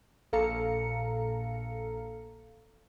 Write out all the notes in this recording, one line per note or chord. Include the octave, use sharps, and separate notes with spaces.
A#1 A#2 A4 F5 A#5 C#7